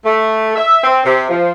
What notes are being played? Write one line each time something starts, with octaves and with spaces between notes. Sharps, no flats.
A3
E5
C4
C3
F3